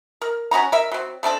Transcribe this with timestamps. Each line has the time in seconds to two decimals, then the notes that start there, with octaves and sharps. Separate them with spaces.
0.21 A#4
0.51 C#4 D#4 F#4 A#5
0.72 A#4 E5
0.91 F#3 C4
1.23 A3 C4 D4 A4